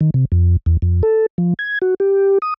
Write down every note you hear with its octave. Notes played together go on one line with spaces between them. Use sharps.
D#3
C3
F2
E2
F2
A4
F3
G#6
F#4
G4
D#6